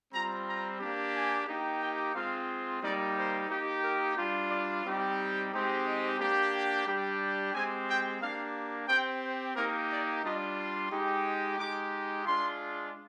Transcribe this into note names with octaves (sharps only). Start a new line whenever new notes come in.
G3 C4 F4 A#5
A#5
A#3 D4 G4
G#5
A#3 D#4 G4
G5
G#3 C4 F4 F5
G3 A#3 D#4 G4 D5
C5
A#3 D#4 G4
A#4
G3 D4 F4
D5
G3 C4 D#4 G4
G#3 C4 D#4 G4
D#5
A#3 D4 G4
G5
G3 D4 G4
G#3 C4 G4 G#5
G5
A#3 D4 G4 F5
C4 G4 G5
C5
A#3 D#4 G4 A#4
D5
G3 D4 F4 D#5
C6
G#3 D#4 G4
G#3 D#4 G4 D6
G#3 D4 F4 C6